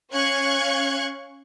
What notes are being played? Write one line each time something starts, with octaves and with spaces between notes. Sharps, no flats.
C#4 F5 C#6 F#6 G#6